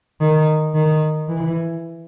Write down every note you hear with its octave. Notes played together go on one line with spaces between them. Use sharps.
D#3
D#3
E3